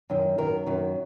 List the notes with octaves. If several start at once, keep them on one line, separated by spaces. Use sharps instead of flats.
F#2 D#3
F#2 D#3 A#4
F#2 D#3